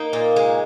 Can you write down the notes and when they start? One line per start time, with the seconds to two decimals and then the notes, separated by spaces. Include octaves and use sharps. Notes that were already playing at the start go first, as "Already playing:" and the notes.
Already playing: A#3 D#4
0.13 A#2
0.36 G#3